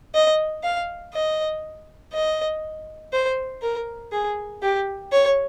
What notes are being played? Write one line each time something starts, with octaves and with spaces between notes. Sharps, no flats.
D#5
F5
D#5
D#5
C5
A#4
G#4
G4
C#5